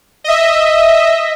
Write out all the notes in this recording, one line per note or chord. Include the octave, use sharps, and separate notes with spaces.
D#5 E5